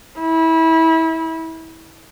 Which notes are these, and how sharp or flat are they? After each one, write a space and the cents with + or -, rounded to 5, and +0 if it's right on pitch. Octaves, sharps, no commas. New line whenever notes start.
E4 -25